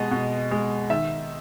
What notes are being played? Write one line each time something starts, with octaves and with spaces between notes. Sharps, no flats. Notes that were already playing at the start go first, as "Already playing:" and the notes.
Already playing: B2 G#3 D#5
B2
G#3
D#3 E5